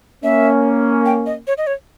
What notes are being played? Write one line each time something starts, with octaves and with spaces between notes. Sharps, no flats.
A#3 C#4 E5
G5
D#5
C#5
D#5
C#5